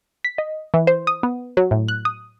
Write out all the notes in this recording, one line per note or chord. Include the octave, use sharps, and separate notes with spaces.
B6
D#5
E3
C5
D#6
B3
F#3
A2
F#6
D#6